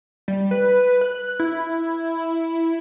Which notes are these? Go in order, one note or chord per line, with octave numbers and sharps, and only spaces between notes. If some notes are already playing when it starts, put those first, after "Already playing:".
G3
B4
F#6
E4